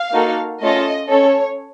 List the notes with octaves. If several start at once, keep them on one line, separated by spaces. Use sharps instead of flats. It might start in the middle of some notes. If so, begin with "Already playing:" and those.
Already playing: F5
A#3 D#4 F#4 A4
A3 C#4 F4 A4 D#5
C#4 A4 C#5